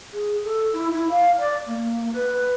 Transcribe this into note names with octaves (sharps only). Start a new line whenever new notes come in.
G#4
A4
E4
E4
F5
D5
A#3
B4